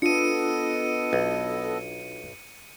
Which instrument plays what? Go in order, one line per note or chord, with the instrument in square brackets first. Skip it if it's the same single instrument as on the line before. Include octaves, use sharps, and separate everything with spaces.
[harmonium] B3 A4 D#5 [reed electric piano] D4 F4 [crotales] C#7 D#7
[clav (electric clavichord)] B1